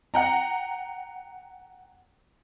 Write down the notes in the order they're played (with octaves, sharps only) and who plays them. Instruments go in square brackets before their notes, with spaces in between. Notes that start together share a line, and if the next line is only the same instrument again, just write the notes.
[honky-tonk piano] F#5 G5 A#5